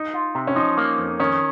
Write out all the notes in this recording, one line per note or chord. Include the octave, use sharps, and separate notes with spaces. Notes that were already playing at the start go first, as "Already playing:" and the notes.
Already playing: D#4
F4
C3
C#4
F3 D#4
A#3
F2
D#3 C#4